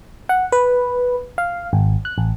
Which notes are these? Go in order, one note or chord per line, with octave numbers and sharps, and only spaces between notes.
F#5
B4
F5
G#1
F#6
A1